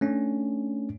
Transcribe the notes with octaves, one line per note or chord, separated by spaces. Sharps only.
A3 C#4 D4